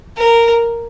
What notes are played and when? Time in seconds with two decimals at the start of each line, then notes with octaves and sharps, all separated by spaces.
0.17 A#4